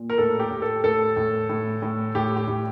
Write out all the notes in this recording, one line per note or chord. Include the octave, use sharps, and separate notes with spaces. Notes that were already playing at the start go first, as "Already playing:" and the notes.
Already playing: A#2
A#4
A2 A4
G4
A2
A4
A2 A4
A2
A2
A2
A2 G4
G4
A2